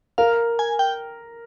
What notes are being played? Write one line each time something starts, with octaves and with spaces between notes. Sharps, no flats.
A#4 F5
G#5
G5